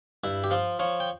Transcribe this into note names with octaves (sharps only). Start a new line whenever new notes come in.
G2 E4
G4
F3 F4
F3 C#5
G5